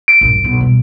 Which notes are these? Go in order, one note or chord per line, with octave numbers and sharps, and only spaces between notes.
D7
A#1 G2
B1
B2 G3